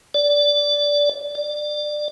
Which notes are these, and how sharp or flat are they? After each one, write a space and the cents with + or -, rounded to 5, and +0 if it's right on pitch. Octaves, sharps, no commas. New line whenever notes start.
D5 -15
D5 +20